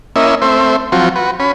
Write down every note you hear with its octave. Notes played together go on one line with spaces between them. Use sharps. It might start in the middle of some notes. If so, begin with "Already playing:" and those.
A#3 C#4 E4 D#5 E5
A3 C4 C5 E5
F3 F#3 C4 F4 F#4
F#4 B4
C#4 B5